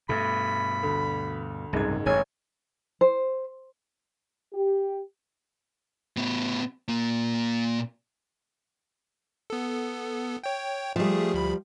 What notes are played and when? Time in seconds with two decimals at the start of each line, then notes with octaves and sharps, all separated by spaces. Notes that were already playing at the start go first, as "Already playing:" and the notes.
0.09 G2 B2 A3 B5
0.83 D2
1.73 F#1 C2 G#2 G#6
2.06 A1 G2 C#5 G#5
3.01 C5
4.53 G4
6.17 A2 B3
6.89 A#2 A#3
9.50 B3 A4
10.43 C#5 G5
10.96 F3 G3 A3 G#4
11.34 D2 B5